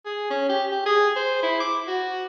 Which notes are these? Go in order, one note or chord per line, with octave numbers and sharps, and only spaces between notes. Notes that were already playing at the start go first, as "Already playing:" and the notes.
G#4
C#4
G4
G4
G#4
C5
E4
D6
F#4